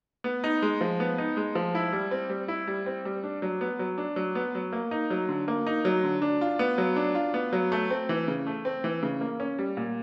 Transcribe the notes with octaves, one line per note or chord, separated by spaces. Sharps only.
B3
D#4
G#3
F3
B3
D#4
G#3
F3
E4
G3
C4
G3
E4
G3
C4
G3
D4
F#3
B3
F#3
D4
F#3
B3
F#3
A#3
D#4
F#3
D3
A#3
D#4
F#3
D3
D4
F4
B3
F#3
D4
F4
B3
F#3
A3
C4
E3
C#3
A3
C4
E3
C#3
A#3
C#4
G3
A#2